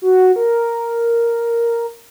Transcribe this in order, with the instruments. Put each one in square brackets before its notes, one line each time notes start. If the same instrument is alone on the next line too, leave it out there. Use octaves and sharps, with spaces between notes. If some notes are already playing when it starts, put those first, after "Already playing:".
[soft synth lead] F#4
A#4